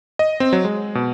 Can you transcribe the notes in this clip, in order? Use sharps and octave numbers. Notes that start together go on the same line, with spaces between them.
D#5
C4
F#3
G#3
B2